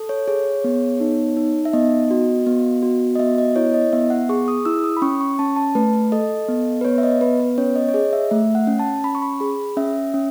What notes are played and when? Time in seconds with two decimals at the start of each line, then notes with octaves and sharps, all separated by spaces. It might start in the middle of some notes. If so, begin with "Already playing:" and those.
Already playing: A4
0.09 C#5
0.28 G#4 C#5
0.64 B3
1.00 D#4
1.37 D#4
1.65 E5
1.73 B3 D#5
2.11 F#4
2.47 B3
2.83 F#4
3.15 D#5
3.19 B3 E5
3.38 D#5
3.56 E4 C#5
3.74 D#5
3.93 B3 E5
4.10 F#5
4.29 G#4 C#6
4.48 D#6
4.65 E4 E6
4.84 D#6
4.97 B5
5.02 C#4 C#6
5.21 C#6
5.39 C#4 A5
5.56 A5
5.75 A3 B4
6.12 A4 D#5
6.48 B3
6.81 B4
6.85 B3 C#5
6.98 E5
7.03 D#5
7.21 B3 B4
7.40 B4
7.58 C#4 C#5
7.76 D#5
7.89 C#5
7.94 G#4 D#5
8.13 E5
8.31 A3 E5
8.55 F#5
8.67 C#4
8.79 A5
9.04 C#4 B5
9.15 C#6
9.22 B5
9.40 G#4 B5
9.77 C#4 E5
10.14 C#4